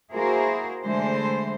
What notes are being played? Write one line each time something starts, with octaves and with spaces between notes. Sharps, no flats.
A#3 E4 F#4 G#4 A#4 C5
D3 E3 G#3 A3 C5